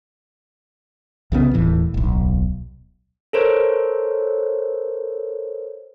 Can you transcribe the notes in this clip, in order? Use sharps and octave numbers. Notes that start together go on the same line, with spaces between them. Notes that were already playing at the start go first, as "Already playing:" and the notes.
C2 C#3 G#3 B3
D#1 A2 E3
D1 B1
A4 A#4 C5 C#5